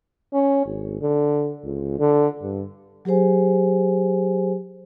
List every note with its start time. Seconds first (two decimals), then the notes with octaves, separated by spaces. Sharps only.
0.34 C#4
0.66 G#1
1.02 D3
1.64 C#2
1.99 D3
2.42 G2
3.05 F#3 G4 G#4 C5 G#5